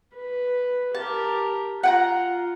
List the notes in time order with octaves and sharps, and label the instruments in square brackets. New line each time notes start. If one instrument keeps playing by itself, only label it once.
[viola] B4
[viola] G4 A#4 [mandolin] A5
[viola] F4 [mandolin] F#5 G5 A#5